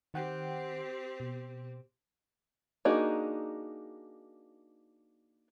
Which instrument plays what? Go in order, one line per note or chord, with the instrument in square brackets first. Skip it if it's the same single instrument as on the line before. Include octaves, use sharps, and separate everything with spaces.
[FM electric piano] D#3 F#5 G5 [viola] C4 G4
[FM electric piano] B2
[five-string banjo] A#3 D4 D#4 F#4 G#4